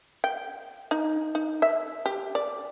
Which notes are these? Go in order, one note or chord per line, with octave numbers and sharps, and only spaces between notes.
G5
D#4
D#4
E5
G4
D5